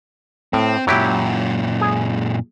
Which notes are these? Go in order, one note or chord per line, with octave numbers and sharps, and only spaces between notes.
A2 C4
F#2 A#2 F#3 E4 G4
G#4